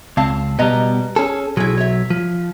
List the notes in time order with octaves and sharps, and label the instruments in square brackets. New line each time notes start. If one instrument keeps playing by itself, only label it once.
[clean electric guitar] C#2 [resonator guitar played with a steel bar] C4 F5 A5
[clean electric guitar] B2 G3 [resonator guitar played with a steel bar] B4 D#5 A#5
[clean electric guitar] C#4 G#4 A4
[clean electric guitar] B1 F#3 [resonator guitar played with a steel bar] E4 G#4
[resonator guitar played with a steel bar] C#5 E5
[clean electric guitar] F3